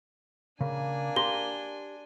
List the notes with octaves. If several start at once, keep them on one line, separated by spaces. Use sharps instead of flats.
C#3 A#3 D4 G#5
G4 A#5 C6 G7